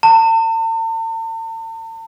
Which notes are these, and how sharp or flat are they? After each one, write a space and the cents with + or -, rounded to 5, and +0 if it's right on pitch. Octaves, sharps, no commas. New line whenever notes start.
A5 +45